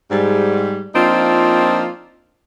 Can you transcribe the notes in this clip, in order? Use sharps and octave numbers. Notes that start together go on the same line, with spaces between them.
G#2 G3
F3 A#3 C4 D4 D#4 F4